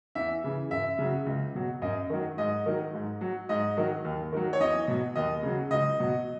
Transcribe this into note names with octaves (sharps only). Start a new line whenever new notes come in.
E2 E5
C#3 E3
F#2 E5
C#3 F#3
C#2
B2 F#3
F#2 D#5
D#3 F#3
G#2 D#5
D#3 F#3
G#2
F#3
G#2 D#5
D#3 F#3
D#2
D#3 F#3
C#5
E2 D#5
B2 F#3
D#2 D#5
C#3 F#3
C#2 D#5
B2 F#3